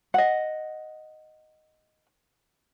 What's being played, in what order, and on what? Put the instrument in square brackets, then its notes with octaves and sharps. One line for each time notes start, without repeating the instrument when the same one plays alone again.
[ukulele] D#5 F#5